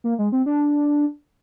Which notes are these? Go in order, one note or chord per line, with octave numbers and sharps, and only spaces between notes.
A#3
G#3
C4
D4